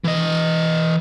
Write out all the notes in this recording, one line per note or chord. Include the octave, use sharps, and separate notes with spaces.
E3 D#5